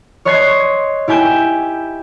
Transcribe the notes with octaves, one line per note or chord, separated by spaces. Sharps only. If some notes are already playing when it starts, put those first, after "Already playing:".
C#5 D#5 C6 F#6 G#6 C7
E4 G4 G#5 G6 D7 E7